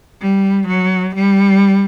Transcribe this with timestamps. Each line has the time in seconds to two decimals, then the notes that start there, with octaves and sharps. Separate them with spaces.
0.21 G3
0.67 F#3
1.15 G3